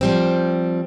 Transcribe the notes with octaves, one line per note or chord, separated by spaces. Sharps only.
F3 G3 C4